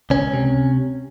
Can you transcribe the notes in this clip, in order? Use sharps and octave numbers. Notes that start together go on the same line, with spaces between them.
C#2 C#4
C3